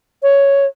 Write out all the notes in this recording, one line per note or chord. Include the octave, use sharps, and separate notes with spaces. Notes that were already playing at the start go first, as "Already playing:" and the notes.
C#5